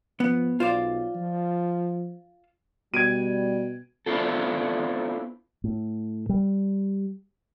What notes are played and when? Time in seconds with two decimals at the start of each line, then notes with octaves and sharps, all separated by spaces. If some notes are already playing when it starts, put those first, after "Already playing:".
0.20 F3 B3
0.60 B1 F4 C5 D5
1.15 F3
2.94 B2 G3 G#6 D7 D#7
4.06 B3 C4 D4 E4 F4 A4
5.64 A2
6.29 G3